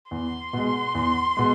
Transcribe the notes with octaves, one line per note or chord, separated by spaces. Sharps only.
E2 C6
B2 G#3
E2
B2 G#3